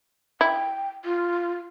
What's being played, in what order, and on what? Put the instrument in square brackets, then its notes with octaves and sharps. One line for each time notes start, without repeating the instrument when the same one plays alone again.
[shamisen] E4 [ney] G5
[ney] F4